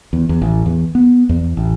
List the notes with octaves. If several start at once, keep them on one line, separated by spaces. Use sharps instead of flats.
E2
E2
A1
E2
B3
E2
A1